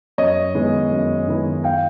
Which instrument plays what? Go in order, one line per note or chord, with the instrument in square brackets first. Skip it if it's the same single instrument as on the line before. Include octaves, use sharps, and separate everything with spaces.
[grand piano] F#2 C#5 D#5
D#3 G#3 B3 E4
F#2
D#3 G#3 B3 E4
F5 G5